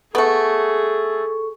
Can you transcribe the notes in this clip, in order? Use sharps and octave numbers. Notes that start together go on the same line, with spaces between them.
A3 B3 G#4 A4 C#6